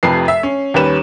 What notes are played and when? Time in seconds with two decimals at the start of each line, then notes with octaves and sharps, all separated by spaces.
0.03 F1 F2 C3 F3 B4 C7
0.28 E5
0.43 C#4
0.74 D#2 G3 C#4 B4 E7